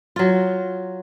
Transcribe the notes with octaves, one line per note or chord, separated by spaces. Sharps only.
F#3 F4